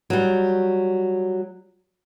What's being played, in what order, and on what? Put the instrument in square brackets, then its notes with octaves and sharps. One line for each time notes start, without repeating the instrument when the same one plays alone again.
[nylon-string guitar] F#3 G3